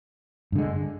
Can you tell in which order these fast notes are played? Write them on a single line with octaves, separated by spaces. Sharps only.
G2 D3 G#3